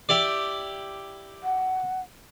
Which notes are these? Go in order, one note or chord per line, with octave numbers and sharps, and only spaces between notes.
E4 G4 D5
F#5